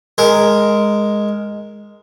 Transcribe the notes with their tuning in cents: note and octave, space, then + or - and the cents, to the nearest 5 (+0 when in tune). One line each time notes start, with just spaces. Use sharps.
G#3 +0 A#4 +0